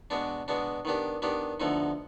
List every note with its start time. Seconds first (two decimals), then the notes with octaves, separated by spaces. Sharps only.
0.10 B2 G#3 B3 D4
0.48 B2 G#3 B3 D4
0.85 D#3 B3 D4 G4
1.22 D#3 B3 D4 G4
1.60 D2 D3 F3 B3 D#4